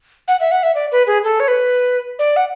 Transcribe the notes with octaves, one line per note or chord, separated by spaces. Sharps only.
F#5
E5
F#5
E5
D5
B4
G#4
A4
C#5
B4
D5
F#5